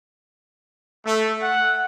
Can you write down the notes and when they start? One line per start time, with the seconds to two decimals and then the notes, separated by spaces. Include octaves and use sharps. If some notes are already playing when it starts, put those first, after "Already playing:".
1.06 A3
1.42 F#5